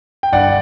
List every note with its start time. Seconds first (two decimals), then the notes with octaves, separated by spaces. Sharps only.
0.23 G5
0.33 G1 G2 D3 D5 F#5